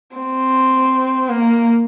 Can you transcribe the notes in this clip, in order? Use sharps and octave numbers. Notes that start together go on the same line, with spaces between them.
C4
A#3